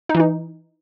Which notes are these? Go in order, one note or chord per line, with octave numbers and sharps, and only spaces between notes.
D#4
E3
D#4